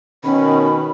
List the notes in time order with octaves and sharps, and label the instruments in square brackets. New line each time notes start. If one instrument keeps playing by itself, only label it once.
[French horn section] B2 D#3 [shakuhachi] C#4 [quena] B5